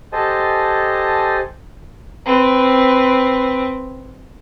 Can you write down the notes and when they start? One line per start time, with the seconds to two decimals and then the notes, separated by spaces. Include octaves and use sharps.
0.13 G4 A4 C5 D#5 G#5 A5
2.25 C4 B4